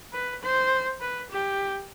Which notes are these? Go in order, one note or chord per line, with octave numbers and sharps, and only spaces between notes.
B4
C5
B4
G4